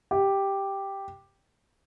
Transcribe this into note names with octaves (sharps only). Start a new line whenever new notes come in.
G4